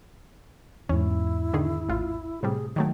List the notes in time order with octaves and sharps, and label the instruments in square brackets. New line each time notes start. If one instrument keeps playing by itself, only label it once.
[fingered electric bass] E2 G#2 [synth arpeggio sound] C#4 [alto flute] E4
[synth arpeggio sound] D3 D#3 G#4
A1 F4
[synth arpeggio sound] A2 C3 G3 [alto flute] G#4
[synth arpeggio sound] D#3 F#3 A3 [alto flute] G5